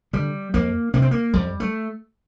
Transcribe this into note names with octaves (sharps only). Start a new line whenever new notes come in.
D3 G3
F2 A#3
C3 A#3
C4
A#3
F2 G3
A3